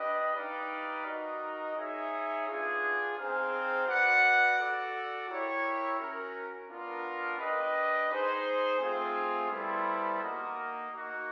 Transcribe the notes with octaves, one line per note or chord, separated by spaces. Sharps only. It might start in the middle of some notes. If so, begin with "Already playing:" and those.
Already playing: D4 G4 B4 D#5
D#4 G4 B4 D5 F5
D#4 F#4 A#4 D#5
D#4 G#4 C#5 E5
B3 D4 F4 G#4
C4 D#4 G#4 C5 F5
F#4 B4 D5 F#5
F#4 A4 D5
E4 G4 A#4 C#5
C#4 F#4 A#4
B3 D4 F4 A#4
D4 G4 B4 D#5
D#4 G#4 C5
A3 C4 F4 G#4
G3 B3 E4 A4 C5
A#3 D#4 F#4 A#4 D#5
A#3 D#4 F#4